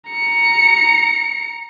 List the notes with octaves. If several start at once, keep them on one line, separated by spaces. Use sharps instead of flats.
A#5 C#7